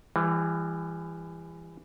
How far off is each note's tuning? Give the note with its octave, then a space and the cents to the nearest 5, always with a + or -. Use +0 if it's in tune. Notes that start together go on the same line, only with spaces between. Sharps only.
E3 +20 G3 +45